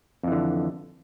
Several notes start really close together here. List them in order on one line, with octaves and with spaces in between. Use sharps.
F2 E3 D3